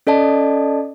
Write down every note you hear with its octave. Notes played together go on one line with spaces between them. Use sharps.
C#4 A4 D5 D#5 A5